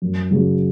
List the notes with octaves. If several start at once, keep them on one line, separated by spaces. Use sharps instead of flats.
F#2
C#3 F#3